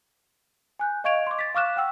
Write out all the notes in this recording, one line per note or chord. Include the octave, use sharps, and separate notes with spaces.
G#5 F#6 G6
D#5 F5 C#6 G#6 D7 F7
C6 D6
A6 B6
F5 C#6 D6 F6 F#6 E7
F#5 G5 E6